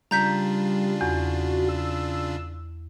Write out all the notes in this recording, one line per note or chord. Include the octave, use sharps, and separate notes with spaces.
C#3 G3 D4 F4 A#5 G6 B6
E2 F#4
E6